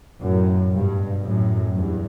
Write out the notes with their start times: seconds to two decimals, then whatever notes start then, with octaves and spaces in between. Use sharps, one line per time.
0.21 F#2 A2
0.72 G2 B2
1.24 F#2 A2
1.75 E2 G2